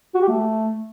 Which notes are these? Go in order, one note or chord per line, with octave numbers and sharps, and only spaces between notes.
F#4
G4
A3